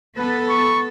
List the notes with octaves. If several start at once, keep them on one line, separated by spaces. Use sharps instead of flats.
B3 A4 B4
B5 C#6